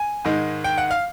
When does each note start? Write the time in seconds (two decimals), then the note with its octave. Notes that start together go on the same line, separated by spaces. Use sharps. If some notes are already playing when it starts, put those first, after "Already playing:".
Already playing: G#5
0.25 G#2 D#3 G#3
0.64 G5
0.78 F#5
0.91 F5